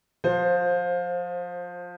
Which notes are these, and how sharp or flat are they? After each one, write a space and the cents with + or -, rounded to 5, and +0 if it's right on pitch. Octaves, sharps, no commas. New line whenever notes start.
F3 +25 C5 +10